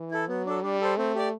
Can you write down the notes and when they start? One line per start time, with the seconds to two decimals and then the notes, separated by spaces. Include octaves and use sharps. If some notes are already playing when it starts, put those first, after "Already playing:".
Already playing: E3
0.11 E4 A4
0.29 F#3 B3
0.46 D4 A4
0.63 G3 D4
0.81 A4 C5
0.97 A3 C4
1.15 G4 D5